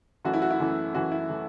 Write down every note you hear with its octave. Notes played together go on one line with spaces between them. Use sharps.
F#2 E3 A3 F#4
E4
F#4
E4
F#2 E3 A3
F#2 E3 A3 F#4
E4
E3 A3